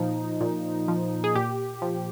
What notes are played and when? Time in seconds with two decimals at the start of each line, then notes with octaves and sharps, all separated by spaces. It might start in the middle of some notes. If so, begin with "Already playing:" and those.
Already playing: A#2 F3 D#4
0.41 A#2
0.88 F3
1.24 G#4
1.35 A#2 G4
1.82 F3